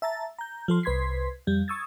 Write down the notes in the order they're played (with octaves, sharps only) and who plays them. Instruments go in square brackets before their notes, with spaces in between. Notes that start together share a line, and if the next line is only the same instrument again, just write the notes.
[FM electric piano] E5 A5 A#5 A6
A#5 G6
F3 A4 C6
C2 B4 C6 G#6 B6 C7
F2 G3
C#6 D#6 E6 G#6 A6